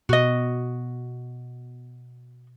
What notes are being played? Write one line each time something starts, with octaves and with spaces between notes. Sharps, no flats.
B2 F#4 D#5